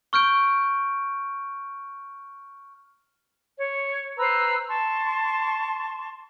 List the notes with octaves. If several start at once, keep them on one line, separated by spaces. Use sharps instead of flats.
C#6 F6 G6 D7
C#5
B4 C5 A#5 E6
A5 C6 C#6